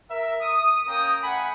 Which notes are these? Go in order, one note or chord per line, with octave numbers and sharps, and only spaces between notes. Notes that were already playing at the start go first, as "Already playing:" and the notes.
A#4 E5
D#6
A#3 C#4 A#4 G5 D#6
A3 F#5 G#5 B5